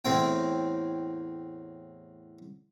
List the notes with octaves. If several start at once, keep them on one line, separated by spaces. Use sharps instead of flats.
E2 A2 C4 G5